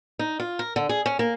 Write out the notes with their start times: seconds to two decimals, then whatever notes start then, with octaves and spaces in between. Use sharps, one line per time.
0.19 D#4
0.40 F4
0.59 A#4
0.76 D3
0.89 G#4
1.06 C#4
1.19 A#3